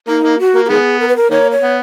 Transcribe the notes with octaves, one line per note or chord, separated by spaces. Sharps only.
A#3 D#4
A#3
F#4
A#3
F#4
D#3 G#3 B3 G#4
A#4
B4
A#4
D#3 A#3 C#5
C#5
B3